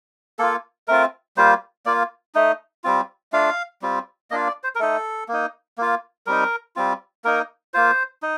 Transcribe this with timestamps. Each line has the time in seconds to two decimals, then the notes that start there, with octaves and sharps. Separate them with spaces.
0.39 A#3 F4 A4
0.88 A3 C4 F4 A#4
1.37 G3 A#3 F4 C5
1.86 A#3 F4 D5
2.35 A3 D#4
2.84 G3 C4 F4
3.33 A3 D4 F4 F5
3.82 G3 C4 F4
4.31 A#3 D4 F4 D#5
4.47 D5
4.63 C5
4.75 A#4
4.80 A3 D#4 A4
5.28 A#3 D#4
5.78 A#3 F4
6.26 G3 C4 D#4 A#4
6.76 G3 C4 F4
7.24 A#3 D#4 A#4
7.74 A#3 F4 C5
8.22 D#4